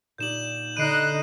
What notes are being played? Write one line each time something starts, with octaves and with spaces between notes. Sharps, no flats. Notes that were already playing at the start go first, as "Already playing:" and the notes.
A#2 D#4 G4 G6 E7 F#7
D3 D#4 D#5 B5 F#6 C7 D7 D#7